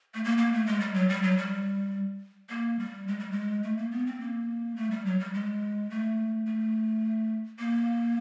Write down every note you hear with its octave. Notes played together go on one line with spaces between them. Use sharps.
A3
A#3
A#3
A3
G#3
G3
F#3
G3
F#3
G3
A#3
G3
G#3
G3
G#3
A3
A#3
B3
C4
A#3
A3
G3
F#3
G3
G#3
A3
A3
A#3